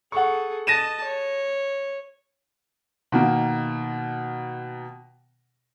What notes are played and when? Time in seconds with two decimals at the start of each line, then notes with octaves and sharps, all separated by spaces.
0.12 G#4 A4 F#5 C#6
0.67 D#5 A5 A#6 D#7 E7
1.04 C#5
3.12 B2 D#3 A#3